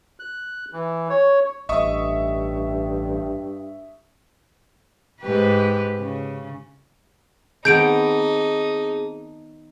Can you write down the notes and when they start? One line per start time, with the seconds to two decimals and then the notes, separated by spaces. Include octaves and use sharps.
0.20 F#6
0.73 E3
1.10 C#5
1.69 A1 G2 D#5 E5 C#6 D#6
5.21 G#2 G4 B4
5.99 C#3
7.65 D#3 B3 C4 D#4 G#4 A5 G6 D7